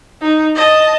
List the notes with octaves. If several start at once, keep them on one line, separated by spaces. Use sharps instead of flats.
D#4
D#5 A5